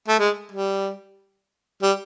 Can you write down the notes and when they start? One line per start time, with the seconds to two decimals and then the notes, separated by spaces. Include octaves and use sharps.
0.08 A3
0.19 G#3
0.52 G3
1.82 G3